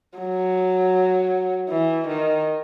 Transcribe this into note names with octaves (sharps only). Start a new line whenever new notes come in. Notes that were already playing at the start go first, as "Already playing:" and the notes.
F#3
E3
D#3